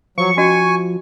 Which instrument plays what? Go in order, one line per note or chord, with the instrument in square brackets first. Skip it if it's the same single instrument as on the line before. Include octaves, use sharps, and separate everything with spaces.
[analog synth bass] F3 [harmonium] F#3 [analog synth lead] C#6
[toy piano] C#4 F#4 D#5 [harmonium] G#5